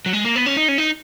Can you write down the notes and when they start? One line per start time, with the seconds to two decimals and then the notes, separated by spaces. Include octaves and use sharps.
0.06 F#3
0.13 G#3
0.25 A#3
0.36 B3
0.46 C#4
0.57 D#4
0.68 C#4
0.78 D#4